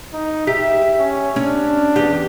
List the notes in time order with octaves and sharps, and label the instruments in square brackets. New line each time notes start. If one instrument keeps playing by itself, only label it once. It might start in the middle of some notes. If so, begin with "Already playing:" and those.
[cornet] D#4
[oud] G4 [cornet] E5
[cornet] C#4
[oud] C#4 [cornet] D4
[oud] E2 G4